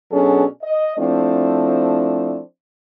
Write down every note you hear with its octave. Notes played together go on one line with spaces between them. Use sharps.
B2 F#3 C#4 D4 G#4 A4
D#5
F3 A3 C4 D4 E4 D5